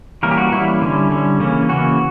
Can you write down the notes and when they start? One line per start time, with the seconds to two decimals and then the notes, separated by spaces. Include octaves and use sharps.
0.23 E3 G3 A#3 C#4 A#4
0.31 G4
0.38 F#4
0.52 E3 G3 A#3 C#4 E4
0.81 D3 G3 C#4
1.11 D3 G3 C#4
1.40 C#3 E3 A#3 C#4
1.69 C#3 E3 A#3 C#4 F#4